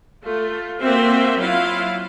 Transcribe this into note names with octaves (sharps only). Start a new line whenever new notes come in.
A3 F4
A#3 C4 F#4 C5 E5
F#3 E4 F4 F5